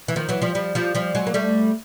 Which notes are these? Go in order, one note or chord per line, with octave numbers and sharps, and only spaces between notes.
E3
D#3 F3
E3 F#3
F3 G3
F3 G3
F3 G3
F3 G3
F#3 G#3
A#3
G3 A3